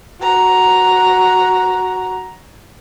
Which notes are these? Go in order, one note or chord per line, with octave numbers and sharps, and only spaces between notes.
F#4 A#5